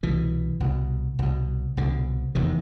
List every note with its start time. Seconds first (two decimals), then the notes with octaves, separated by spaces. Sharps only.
0.03 C2 B2 E3
0.60 C2 B2
1.19 C2 B2
1.77 C2 B2 D3
2.35 F1 E2 C3 D#3